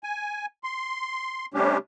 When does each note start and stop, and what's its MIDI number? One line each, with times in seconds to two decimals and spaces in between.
0.03 0.46 80
0.64 1.46 84
1.54 1.77 48
1.54 1.77 55
1.54 1.77 57
1.54 1.77 61
1.54 1.77 62
1.54 1.77 67